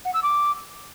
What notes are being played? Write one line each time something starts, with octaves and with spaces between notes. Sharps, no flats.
F#5
E6
D6